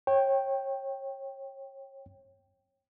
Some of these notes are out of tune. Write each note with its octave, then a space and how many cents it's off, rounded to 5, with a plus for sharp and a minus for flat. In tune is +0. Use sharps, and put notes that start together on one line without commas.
C#5 -30 G5 +0